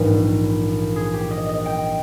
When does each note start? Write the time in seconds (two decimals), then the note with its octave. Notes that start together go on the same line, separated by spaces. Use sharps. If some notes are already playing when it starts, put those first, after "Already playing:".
Already playing: A#1 G#2 E3 G3 A#4
0.96 G#4
1.14 G4
1.31 D#5
1.49 D#5
1.66 G5